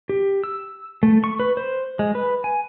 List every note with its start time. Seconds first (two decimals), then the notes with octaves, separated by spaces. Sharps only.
0.09 G4
0.44 E6
1.03 A3
1.24 C#6
1.40 B4
1.57 C5
1.99 G#3
2.15 B4
2.44 G#5